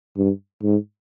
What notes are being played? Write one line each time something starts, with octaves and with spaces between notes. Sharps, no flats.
G2
G#2